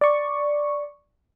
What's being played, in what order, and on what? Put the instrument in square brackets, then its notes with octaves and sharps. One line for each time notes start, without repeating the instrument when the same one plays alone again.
[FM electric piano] D5 C#6